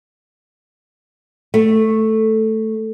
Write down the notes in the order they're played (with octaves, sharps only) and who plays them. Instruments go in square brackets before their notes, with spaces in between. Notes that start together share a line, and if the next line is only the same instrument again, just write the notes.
[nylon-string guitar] A3